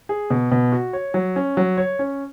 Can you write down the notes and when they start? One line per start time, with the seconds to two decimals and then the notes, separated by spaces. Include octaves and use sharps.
0.09 G#4
0.30 B2
0.51 B2
0.72 F#4
0.93 C#5
1.14 F#3
1.36 C#4
1.57 F#3
1.77 C#5
1.99 C#4